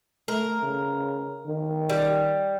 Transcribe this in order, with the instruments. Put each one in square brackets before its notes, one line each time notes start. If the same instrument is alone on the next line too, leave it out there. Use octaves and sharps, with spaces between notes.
[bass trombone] A3 [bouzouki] A#4
[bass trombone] C#3
D#3
[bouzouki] G3